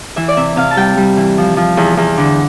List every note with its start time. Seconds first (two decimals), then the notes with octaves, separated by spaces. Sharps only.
0.16 E3 E5
0.28 D5
0.37 C3 E5
0.56 C3 F5
0.71 A5
0.76 G3 G5
0.97 G3
1.17 E3
1.38 F3
1.57 F3
1.77 E2
1.97 E2
2.18 D3